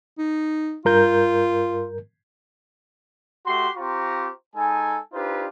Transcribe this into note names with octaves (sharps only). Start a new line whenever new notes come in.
D#4
G2 F4 A#4 G6
A3 F#4 G4 C6
C4 F4 G4 C5 A#5 C#6
G#3 D#4 A4 G#5
D4 D#4 F4 G4 B4 C5